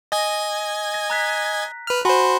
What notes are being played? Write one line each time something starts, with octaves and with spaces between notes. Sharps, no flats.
D#5 G#5 G#6 A#6
A#6
A#5 F#6 B6
B4 F6
F#4 C5 G#5 B5 C6